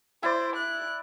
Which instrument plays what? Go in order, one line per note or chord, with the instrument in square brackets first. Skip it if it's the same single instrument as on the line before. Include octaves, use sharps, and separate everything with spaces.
[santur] E4 D5 [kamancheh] C5
[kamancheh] F#6